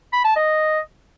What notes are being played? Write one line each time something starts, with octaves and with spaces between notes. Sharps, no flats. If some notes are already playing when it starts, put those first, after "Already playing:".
B5
A5
D#5